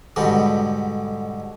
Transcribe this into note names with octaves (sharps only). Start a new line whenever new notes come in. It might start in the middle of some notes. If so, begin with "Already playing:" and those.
G#2 B2 D3 G3